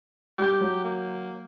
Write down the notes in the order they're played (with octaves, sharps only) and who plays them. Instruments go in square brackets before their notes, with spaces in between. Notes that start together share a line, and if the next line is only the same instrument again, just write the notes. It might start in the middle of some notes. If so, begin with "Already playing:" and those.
[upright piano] G3 G6 [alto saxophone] G4
[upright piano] F#3
[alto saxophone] A#3